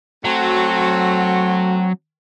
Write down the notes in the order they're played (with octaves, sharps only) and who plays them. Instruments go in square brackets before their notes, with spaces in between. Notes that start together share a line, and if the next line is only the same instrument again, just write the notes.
[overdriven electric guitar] F#3 [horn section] A3 C4 F#4